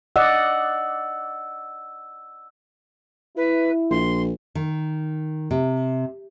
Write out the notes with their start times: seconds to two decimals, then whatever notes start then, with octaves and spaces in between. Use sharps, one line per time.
0.16 D5 D#5 F#5 E6
3.36 E4 B4
3.90 A#1 C6
4.55 D#3
5.51 C3